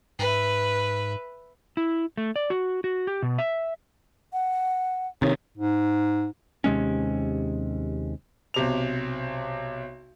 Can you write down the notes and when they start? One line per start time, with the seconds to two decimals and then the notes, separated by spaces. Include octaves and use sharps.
0.19 G#2 B4 E5
1.77 E4
2.17 A3
2.36 D5
2.50 F#4
2.84 F#4
3.07 G4
3.22 B2
3.38 E5
4.33 F#5
5.22 C3 D#3 C#5
5.58 G#2
6.64 D#2 C3 G#3 C#4
8.54 B1 C3 F7